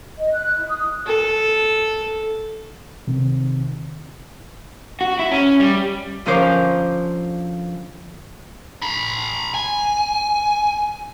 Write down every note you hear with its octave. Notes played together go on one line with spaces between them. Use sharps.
D#5
F#6
E4
D#6
A4
C3 D#3 C4
F#4
E4
C#4
G3
D3 F3 C#4 A#4 C5 D6
A#5 B5
G#5